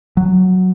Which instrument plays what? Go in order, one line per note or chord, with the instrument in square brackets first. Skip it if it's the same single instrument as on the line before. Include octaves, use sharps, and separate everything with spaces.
[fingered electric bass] F#3